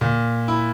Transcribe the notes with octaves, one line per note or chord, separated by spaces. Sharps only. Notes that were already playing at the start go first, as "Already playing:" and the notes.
A#2
E4